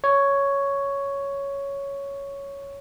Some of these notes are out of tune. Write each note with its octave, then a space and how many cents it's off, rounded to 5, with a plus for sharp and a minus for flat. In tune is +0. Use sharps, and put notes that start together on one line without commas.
C#5 +5